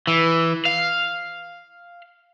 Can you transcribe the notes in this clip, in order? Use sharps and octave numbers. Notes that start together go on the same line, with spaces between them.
E3
F5